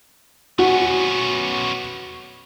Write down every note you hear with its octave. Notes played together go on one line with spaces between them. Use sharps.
B3 C#4 F#4